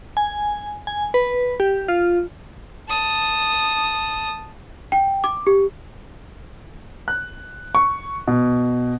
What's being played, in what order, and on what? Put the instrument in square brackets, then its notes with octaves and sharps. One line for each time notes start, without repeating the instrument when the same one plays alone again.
[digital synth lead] G#5
G#5
B4
G4
F4
[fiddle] A5 D#6
[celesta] G5
D6
G4
[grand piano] F#6
C#6
B2